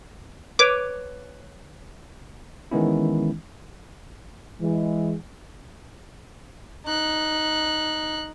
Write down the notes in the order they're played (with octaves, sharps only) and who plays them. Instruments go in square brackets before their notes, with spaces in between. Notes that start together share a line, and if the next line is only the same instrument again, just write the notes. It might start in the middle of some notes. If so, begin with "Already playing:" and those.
[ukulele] B4 C#5 [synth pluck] D6
[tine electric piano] D#3 E3 G#3 B3 C#4 E4
[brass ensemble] E3 G#3
[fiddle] D#4 F#6